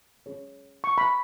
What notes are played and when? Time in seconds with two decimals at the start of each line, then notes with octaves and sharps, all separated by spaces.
0.26 C#4 G#4 C#5
0.84 C#6
0.98 B5